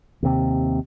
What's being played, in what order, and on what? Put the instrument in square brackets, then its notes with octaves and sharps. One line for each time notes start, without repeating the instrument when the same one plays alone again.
[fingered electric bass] D#2 C3